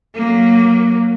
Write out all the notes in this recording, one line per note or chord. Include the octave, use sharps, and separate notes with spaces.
F#3 A#3